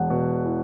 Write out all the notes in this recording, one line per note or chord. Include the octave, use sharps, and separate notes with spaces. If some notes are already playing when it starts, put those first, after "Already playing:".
Already playing: E1 E2 F#5
B2
E3